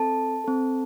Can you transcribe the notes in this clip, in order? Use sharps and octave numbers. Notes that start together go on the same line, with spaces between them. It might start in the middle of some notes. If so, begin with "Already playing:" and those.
Already playing: C4 A4 A5
C4 A4